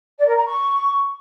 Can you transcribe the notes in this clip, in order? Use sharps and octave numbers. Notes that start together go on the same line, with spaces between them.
D5
A#4
A#5
C#6